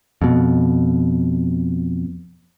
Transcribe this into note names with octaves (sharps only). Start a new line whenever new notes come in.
F2 B2